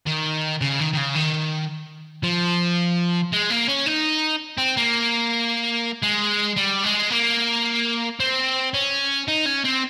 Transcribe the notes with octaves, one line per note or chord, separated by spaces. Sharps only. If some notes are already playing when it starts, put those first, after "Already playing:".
D#3
C#3
D#3
D#3
C#3
D#3
F3
G#3
A#3
C#4
D#4
C4
A#3
G#3
G3
G#3
A#3
C4
C#4
D#4
C#4
C4